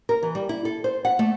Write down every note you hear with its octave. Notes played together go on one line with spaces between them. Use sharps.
A#4
E3
G3
E4
A4
C5
F#5
A3